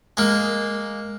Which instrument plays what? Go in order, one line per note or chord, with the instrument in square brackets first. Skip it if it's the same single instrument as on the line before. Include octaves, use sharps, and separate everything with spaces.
[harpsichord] G#3 A#3